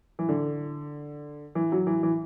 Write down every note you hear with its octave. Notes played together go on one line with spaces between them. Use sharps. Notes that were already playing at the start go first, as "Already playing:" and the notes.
E3
D3
E3
F#3
E3
E3